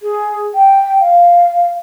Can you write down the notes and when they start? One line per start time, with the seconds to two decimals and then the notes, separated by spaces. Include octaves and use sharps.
0.02 G#4
0.55 G5
1.00 F5